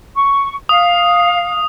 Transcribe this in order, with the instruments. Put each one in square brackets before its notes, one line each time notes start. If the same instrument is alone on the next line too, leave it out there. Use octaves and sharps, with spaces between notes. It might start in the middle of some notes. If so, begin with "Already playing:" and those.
[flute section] C#6
[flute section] F5 [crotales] D#6